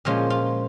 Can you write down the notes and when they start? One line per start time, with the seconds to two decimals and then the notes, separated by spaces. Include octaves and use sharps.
0.05 A#2 F3 G#3 C#4 F4
0.30 F4